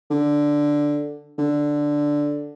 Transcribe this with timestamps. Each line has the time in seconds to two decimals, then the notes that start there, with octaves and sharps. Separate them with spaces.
0.11 D3
1.38 D3